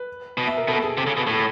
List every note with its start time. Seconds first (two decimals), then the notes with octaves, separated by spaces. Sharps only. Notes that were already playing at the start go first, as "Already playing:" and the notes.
Already playing: B4
0.37 B2
0.47 E5
0.57 A#4
0.67 B2 A4
0.82 G#4
0.97 C3 A4
1.07 C#3
1.17 B2
1.27 A2 A4